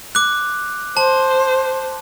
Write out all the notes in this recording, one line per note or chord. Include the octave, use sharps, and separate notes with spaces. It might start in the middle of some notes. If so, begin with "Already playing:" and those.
D6 F#6
C5 A5